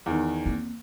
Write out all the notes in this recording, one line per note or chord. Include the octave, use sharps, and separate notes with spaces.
E2 D#3
A#3 C4